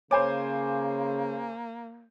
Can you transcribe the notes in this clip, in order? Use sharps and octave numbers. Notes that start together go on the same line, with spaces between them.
C#3 A#3 C5 C#5 G#5 B5 D6